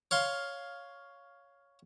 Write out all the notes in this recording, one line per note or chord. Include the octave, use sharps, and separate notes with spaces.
C#5 F5 C6